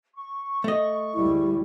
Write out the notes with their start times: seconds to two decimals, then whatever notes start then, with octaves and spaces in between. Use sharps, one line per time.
0.14 C#6
0.64 A3 D#5
1.15 D2 G3 G#3 E4